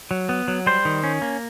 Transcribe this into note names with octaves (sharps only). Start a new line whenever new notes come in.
F#3
B3
F#3
G3 C5
D#3
C#4
A#3